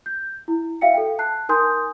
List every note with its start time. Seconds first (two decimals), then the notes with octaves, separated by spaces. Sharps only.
0.06 G6
0.48 E4
0.81 F#4 E5 F5 G5 C#7
0.94 A4 G5
1.19 A5 F#6 C7
1.49 D#4 A#4 G#5 C6 D#6 G6